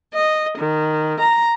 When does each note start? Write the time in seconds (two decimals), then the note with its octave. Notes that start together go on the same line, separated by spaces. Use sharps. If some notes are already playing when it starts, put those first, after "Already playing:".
0.14 D#5
0.57 D#3
1.20 A#5